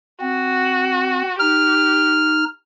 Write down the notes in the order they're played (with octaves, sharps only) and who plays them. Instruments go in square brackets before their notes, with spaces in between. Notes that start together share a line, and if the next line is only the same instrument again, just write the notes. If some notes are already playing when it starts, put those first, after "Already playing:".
[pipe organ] C4 [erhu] F#4
[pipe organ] D#4 [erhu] G4 [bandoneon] F6